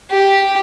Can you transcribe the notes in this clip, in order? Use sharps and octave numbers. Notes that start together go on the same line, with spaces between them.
G4